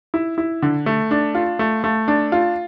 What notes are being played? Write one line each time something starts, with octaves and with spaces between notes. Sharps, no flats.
E4
E4
D3
A3
D4
F4
A3
A3
D4
F4